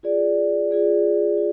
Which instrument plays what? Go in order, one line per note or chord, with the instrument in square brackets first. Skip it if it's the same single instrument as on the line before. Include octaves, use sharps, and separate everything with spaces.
[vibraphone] F4 G#4 D5
F4 G#4 D5
F4 G#4